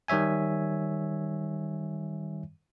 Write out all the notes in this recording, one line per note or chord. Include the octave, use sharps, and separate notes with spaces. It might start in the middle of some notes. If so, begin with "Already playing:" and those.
D#3 G3 C#5 E5 G#5